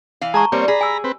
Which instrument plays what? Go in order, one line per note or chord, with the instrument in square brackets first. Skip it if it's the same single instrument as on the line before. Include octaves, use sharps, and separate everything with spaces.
[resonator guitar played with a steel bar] E3 F5
[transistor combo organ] G#3 G#4 [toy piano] A5 A#5 C#6
[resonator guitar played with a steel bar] G3 [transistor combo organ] A#3 C4 C#5
[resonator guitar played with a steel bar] G#4 [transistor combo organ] A#5 B5
[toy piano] G#5 E6
[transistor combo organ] C4 B4